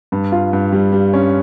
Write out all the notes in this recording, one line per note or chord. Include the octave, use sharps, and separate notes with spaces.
G2
F4
G2
G3
G3
C#4